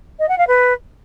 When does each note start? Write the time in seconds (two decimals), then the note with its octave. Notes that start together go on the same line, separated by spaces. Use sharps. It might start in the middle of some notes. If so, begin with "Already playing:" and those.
0.19 D#5
0.29 F#5
0.38 F5
0.48 B4